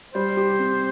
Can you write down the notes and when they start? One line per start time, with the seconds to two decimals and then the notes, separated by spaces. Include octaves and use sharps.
0.14 G3 C5
0.37 G4
0.59 C4